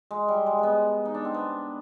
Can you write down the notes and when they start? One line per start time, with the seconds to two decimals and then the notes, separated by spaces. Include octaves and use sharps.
0.11 G#3
0.28 G3
0.46 G#3
0.58 G#3 B3
1.05 D#4
1.14 D4
1.25 C4
1.34 B3